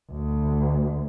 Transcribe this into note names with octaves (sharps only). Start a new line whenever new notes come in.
D2